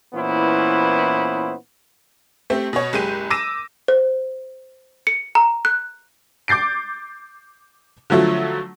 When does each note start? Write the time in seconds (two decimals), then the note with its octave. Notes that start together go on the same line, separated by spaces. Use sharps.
0.13 A#2 E3 B3 C#4 E4 C5
2.50 A3 C4 G4
2.73 B2 C#5
2.93 F#1 G#3 G4 G6 D#7
3.30 D6 E6 A#6 D#7 E7
3.88 C5
5.07 C#7
5.35 A#5
5.65 F#6
6.48 D6 G6 A6 C7 D7
8.10 D3 F3 F#3 A3